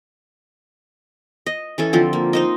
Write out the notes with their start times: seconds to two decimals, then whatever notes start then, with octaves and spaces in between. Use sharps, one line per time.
1.46 D#5
1.78 E3 C#4 A4
1.93 D3 F3 C4
2.13 A#3
2.33 D#4 C5 D#5